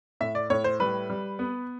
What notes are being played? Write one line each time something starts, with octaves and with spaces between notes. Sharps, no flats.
A2 E5
D5
A2 C#5
C5
G3 B4
G3
B3